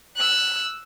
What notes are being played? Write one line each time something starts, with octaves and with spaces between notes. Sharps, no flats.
E6 F#6